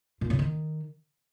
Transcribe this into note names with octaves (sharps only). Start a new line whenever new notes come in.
A#2
C#3
D#3